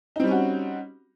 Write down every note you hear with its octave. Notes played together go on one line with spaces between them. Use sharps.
G3 C4 C#4 D#4 F#4